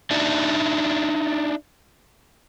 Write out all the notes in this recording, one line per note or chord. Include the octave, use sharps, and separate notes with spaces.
D4 D#4 D5 E5